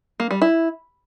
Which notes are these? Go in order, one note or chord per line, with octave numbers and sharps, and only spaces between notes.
A#3
G3
E4